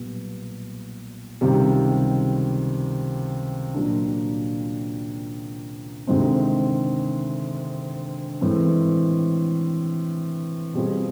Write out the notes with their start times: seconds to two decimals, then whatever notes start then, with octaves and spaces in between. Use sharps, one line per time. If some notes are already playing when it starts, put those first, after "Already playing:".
Already playing: B1 A#2 G3 B3
1.41 C#2 C3 D#3 G3
3.74 A#2 F#3 A#3 D4
6.07 D2 C3 D#3 G#3 C4
8.41 A2 E3 G#3 C4
10.74 B2 G3 C4 F4 G#4